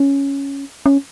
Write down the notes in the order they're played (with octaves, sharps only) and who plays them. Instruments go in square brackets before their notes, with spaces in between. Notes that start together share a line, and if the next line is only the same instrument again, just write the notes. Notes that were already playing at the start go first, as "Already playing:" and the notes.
Already playing: [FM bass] C#4
C#4